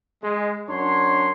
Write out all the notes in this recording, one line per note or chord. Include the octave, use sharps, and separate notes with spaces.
G#3
F#2 D4 C#5 C6